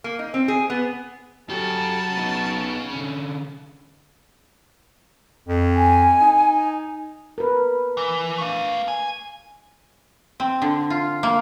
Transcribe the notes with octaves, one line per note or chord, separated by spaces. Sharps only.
A#3
D#4
C4
G#4
B3
C#3 F#3 G4 A4 A5
B3 D#4
D3 C#4
F2
G#5
D#4
A#4 B4
E3
A3 F5
G#5
C4
D3
F4
A#3